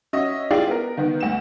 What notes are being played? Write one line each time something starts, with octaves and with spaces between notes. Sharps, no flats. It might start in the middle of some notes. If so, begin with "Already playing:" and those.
C#4 F#4 D#5 E5
E4 F4 G4 G#4 D5 F5
B3 A#4
D#3 B3
D2 E7